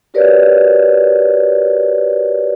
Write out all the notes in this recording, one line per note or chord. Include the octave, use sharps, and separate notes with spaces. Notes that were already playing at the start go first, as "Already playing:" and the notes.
F#4 G4 A#4 B4 C#5 D5